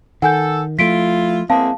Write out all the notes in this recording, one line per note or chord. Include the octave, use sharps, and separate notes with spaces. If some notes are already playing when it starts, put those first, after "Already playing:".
D#3 A4 F#5 G#5 G6
F3 A3 E4 F4 B6 D7
E2 G#3 A#3 C4 F5 A5